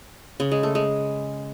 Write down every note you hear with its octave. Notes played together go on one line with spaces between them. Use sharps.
C#3
G#3
A3
G#3